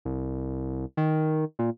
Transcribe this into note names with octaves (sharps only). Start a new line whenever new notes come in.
C2
D#3
A#2